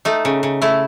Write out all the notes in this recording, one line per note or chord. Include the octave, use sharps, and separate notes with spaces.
A3 D#4
C#3
C#3
A3 E4